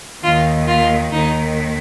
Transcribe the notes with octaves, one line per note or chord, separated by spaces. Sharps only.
D#2 D#3 F4
F4
D#2 D#3 D#4